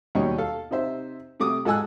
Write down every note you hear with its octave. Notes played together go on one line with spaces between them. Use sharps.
D#2 B2 G3 D#4 C#5 C#6
A4 F5
C3 D#4 C5 E5
C3 A3 D6 D#6
G#2 A4 D#5 G#5 E6 F#6